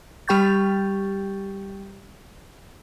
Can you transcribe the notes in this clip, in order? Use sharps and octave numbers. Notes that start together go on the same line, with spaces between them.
G3 G4 G5 C#6 G6 A6